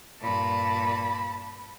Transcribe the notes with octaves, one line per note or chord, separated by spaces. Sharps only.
G2 A#2 A5 B5